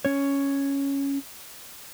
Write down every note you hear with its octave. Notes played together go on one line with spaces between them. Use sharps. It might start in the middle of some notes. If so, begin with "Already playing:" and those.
C#4 C#5